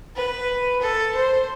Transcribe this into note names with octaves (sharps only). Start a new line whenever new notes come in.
B4
A4
C5